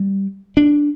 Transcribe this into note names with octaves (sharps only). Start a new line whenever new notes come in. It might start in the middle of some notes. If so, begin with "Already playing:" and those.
Already playing: G3
D4